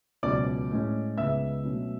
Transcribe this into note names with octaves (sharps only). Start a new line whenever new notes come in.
C#2 B2 F#3 C#4 D5 D6
A2 G#3 C#4
C#2 C#3 G#3 B3 E5 E6
B2 F#3 A3 C#4